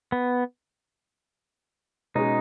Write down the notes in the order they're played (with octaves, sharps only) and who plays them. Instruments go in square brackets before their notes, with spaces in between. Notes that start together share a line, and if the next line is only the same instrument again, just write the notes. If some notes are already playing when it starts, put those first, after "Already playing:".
[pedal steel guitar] B3
[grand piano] B2 G#3 C#4 G#4 [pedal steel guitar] D#4